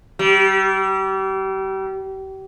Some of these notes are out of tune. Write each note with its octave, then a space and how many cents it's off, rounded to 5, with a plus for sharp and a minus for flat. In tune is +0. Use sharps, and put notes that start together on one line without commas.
G3 -35